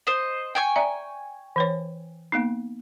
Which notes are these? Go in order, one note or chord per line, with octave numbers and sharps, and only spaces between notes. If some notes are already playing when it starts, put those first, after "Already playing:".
C5 D#5
G5 G#5 C#6
D5 E5 A#5
E3 B4 C#5
A#3 B3 D#4